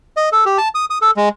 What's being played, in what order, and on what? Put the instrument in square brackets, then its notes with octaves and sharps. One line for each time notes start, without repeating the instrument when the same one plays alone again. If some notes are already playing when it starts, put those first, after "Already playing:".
[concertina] D#5
A4
G4
A5
D#6
D#6
A4
G#3